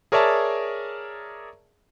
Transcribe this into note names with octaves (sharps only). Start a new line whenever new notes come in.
G#4 A#4 C#5 D5 E5 A5